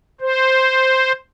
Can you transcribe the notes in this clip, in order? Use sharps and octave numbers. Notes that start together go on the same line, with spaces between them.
C5